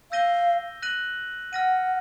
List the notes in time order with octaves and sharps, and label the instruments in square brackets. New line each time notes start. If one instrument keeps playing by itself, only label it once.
[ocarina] F5 [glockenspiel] E6 G6 A#6 D#7 G7
[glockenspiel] F#6 A#6 D#7 F#7
[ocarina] F#5 [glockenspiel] F6 A#6 D#7